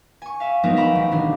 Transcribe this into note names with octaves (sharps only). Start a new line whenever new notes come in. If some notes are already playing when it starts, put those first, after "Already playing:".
G#5 C#6
E5 F5
F3 F#3 G#3 B3 D#4 A#4
E5 F5 G5 A#5 B5 C#6
A1
B2 D#3 G3 D4 G#4